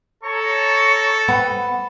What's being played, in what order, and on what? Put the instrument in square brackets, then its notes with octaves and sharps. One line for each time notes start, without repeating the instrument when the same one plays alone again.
[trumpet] A4 [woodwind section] C#5 A#5 C#6
[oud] B3